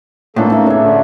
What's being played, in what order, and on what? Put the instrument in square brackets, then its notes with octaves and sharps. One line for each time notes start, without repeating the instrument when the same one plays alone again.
[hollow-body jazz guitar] A2 [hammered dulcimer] C#3 E3 [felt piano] G#3 D4 F4 [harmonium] A#3 A4
[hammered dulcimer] C#3 E5 [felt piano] D#4
[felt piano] C#4 G#4 [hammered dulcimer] D4 E5
[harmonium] D3 A3